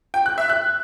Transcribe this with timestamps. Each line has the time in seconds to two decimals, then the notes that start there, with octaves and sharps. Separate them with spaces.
0.14 G5
0.26 F#6
0.38 E5
0.50 F#6